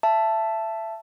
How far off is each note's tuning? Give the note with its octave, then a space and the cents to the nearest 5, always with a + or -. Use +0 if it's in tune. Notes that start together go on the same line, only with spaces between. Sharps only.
E5 +20 A5 +0